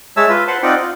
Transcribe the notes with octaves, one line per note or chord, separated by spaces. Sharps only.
G#3 C#5 E5 A5 E6
F4 B4
B4 C5 F#5 A5
C4 D#4 F4 D5 F#5 G5
F4